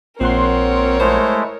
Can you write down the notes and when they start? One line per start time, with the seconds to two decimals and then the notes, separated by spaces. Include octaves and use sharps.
0.20 A#1 C4 A#4 C#5 F#5 C6
1.00 G#3 A3 E4 C5